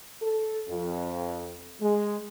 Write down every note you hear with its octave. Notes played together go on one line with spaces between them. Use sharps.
A4
F2
G#3